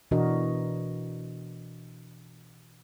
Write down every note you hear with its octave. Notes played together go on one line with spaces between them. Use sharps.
B2 E3 D4 F#4 A#4 D#5